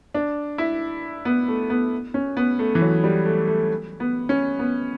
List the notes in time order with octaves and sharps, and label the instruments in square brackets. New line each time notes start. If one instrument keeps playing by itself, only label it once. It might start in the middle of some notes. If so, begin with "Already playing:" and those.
[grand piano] D4
E4
B3
A3
B3
C#4
B3
A3
E3
F#3
G3
A3
A3
B3
C#4
B3